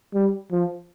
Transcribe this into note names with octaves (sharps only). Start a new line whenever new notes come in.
G3
F3